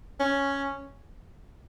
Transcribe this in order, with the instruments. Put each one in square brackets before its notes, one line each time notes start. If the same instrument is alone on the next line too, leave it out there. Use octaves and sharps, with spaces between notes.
[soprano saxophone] C#4